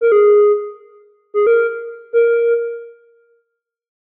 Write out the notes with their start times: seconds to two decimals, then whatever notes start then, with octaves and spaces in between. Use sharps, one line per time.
0.01 A#4
0.12 G#4
1.34 G#4
1.47 A#4
2.13 A#4